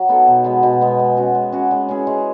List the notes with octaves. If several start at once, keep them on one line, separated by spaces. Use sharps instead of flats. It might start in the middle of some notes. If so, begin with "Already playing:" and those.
Already playing: F#3
B3 D#4 A4
B2
G#3 B3
B2
G#3 B3
G#3
C#4 F#4
G#3
C#4 F#4
G#3
C#4 E4 G#4
G#3